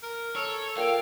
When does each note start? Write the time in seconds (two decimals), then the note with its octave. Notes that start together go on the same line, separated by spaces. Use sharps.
0.03 A#4
0.36 A4 C#5
0.77 A#2 F5 G5